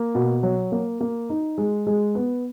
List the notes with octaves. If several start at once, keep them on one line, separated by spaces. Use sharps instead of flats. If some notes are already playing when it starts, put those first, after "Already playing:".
Already playing: A#3
B2
F#3
A#3
A#3
D#4
G#3
G#3
B3